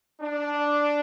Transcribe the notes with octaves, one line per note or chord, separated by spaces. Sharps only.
D4